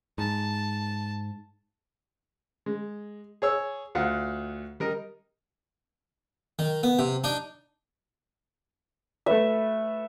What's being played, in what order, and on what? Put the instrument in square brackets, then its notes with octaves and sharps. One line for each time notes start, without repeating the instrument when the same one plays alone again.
[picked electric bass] G#2 [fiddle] A5
[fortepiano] G#3
G#4 C#5 E6
D2 F4 F5 F#5
G3 A#4 D#5
[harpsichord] D#3
B3
C3
D4 D#4
[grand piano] A3 B4 [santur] E5